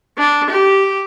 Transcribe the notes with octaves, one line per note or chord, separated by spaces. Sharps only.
D4
G4